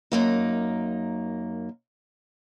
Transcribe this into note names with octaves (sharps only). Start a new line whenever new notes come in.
F#2 A#3 D#4